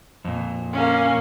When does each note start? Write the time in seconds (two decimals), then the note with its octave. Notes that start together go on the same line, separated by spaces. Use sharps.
0.25 F2 A#2
0.73 A#3 C#4